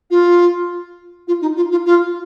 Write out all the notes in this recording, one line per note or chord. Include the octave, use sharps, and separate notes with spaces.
F4
F4
D#4
F4
F4
F4